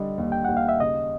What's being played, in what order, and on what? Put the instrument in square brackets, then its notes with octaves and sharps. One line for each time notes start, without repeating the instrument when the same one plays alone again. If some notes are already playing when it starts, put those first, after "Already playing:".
Already playing: [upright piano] D3 G3 [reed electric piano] D#5
[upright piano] D#2
[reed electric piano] G5
[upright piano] D#2 [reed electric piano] F#5
[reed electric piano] F5
E5
[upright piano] C#3 [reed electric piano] D#5